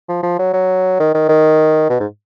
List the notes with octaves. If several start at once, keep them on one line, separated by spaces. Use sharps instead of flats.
F3
F3
F#3
F#3
D#3
D#3
D#3
B2
G#2